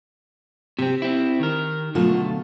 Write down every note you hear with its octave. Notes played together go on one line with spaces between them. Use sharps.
C3 C4 G4
C4 E4
D#3 A#4
D2 B2 F#3 A3 F4